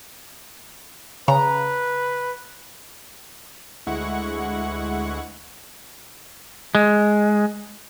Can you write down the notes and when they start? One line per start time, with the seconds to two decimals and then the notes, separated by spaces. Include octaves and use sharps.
1.28 C#3 B4 A#5
3.87 D2 G#3 E4 F#5 C#6
6.75 G#3